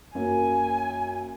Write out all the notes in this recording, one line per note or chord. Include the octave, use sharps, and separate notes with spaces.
F#2 A#3 G#5